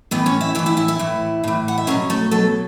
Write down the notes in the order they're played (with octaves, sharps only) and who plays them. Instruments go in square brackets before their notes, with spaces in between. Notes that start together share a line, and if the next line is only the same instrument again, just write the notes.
[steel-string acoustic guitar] A2 E3 B3 B4
C#4 C#5
E4 E5
E3 E4 E5
A2
E4 E5
E4 E5
E4 E5
A2 E3
A2 E3
F#5
E5
B2 F#3 C#4 C#5
A3 A4
B2 F#3 A3 A4